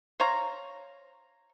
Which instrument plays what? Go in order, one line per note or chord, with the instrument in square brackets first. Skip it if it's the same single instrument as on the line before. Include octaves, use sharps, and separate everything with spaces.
[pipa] C5 C#5 F5 A#5